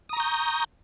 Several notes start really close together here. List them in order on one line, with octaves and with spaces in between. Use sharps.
D#6 A#5 C#6 G6